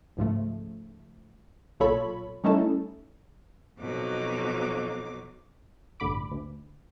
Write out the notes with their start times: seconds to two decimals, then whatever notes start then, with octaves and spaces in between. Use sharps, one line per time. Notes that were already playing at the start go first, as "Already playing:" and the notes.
0.17 C#2 G#2 F3 A3
1.80 B1 A#2 F4 A4 C#5 B5
2.44 G3 A3 C#4 D#4 E4 A4
3.79 F2 B2 F#3 D#4 D6
6.00 A1 G2 D3 B5 D6
6.31 D2